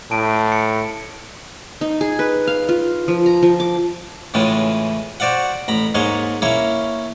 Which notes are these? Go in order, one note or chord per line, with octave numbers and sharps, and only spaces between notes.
A2 A5 D7
C#7
D#4
G#4
B4
F5
F4
F3
A#5
F3
D6
A2 C#3 E3 G#3 F4
F#4 C5 D5 F5 F#5
A1 A#5 B5
G#2 G#3 A#3 C#5 C6
A#3 C#4 E4 C#5 F5